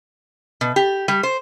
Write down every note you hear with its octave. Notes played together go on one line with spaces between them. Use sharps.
B2
G4
G3
C5